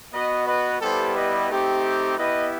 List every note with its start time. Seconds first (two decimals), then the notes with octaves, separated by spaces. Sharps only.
0.12 B3 F#4 B4 D#5
0.46 B4 D#5
0.80 G3 B3 E4 G4 A4 C5
1.15 B4 D#5
1.48 A3 C4 D#4 G4
2.17 B3 E4 G4 B4 D#5